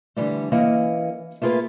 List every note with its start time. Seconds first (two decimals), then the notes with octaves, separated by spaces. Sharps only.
0.16 D3 E3 G3 A3
0.52 E3 A#3 C#4 D#5
1.42 A3 A#3 F4 G#4 B4